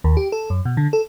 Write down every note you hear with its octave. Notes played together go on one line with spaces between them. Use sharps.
D#2
G4
A4
F#2
B2
D3
A4